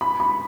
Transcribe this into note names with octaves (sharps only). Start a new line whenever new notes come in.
B5
B5